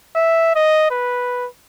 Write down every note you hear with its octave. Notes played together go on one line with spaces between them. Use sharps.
E5
D#5
B4